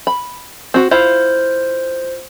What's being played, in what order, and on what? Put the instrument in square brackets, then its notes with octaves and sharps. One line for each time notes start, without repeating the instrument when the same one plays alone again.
[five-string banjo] B5
C4 F#4
[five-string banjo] E4 F4 F5 [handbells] C5